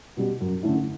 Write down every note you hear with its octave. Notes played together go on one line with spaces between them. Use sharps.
B2 G3
F#2
D3 A3 C#4 E4